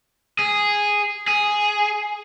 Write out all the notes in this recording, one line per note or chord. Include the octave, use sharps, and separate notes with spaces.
G#4
G#4